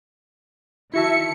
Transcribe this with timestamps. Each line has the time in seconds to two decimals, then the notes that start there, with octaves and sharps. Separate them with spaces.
0.94 D#3 E4 F#4 E5 A5 C#7